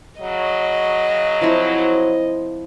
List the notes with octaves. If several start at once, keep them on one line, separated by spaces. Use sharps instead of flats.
C#3 F#3 D#5
F3 C4 E4